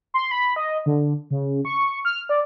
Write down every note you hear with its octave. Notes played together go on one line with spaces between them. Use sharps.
C6
B5
D#5
D3
C#3
C#6
F6
D5